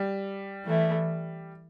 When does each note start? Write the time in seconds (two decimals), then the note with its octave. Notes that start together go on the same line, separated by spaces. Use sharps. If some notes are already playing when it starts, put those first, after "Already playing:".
Already playing: G3
0.65 E3 A3 E4